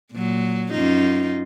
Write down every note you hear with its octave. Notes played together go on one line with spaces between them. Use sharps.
A#2 F#3
F#2 D#4 F4